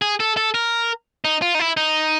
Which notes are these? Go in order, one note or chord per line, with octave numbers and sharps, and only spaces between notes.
G#4
A4
A4
A#4
D#4
F4
D#4
E4
D#4